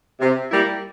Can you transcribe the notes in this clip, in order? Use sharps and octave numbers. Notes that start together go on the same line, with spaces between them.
C3
G3 A#3 E4 G4